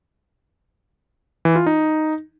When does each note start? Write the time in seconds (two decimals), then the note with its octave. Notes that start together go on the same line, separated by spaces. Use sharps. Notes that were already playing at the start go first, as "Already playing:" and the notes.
1.45 E3
1.56 F4
1.66 D#4